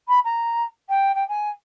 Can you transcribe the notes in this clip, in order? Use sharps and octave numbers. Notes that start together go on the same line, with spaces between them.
B5
A#5
G5
G5
G#5